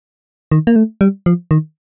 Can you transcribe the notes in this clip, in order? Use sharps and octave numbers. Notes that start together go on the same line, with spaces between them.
D#3
A#3
A3
G3
F3
D#3